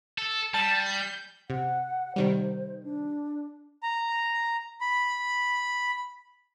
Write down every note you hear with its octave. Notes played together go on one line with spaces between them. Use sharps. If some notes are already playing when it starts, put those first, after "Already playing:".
A4
G3 A5
G6
C3 F#5
C3 D#3 G3 C5
D4
A#5
B5